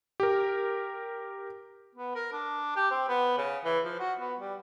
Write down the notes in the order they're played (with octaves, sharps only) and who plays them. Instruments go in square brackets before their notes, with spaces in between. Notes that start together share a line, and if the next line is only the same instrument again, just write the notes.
[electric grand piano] G4 A#4
[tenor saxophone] B3
A#4
D4
G4
C4
B3
C#3
E3
F3
F#4
B3
G3